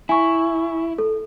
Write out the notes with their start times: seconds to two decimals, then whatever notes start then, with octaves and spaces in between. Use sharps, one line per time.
0.09 E4 G#5 C#6
0.98 A4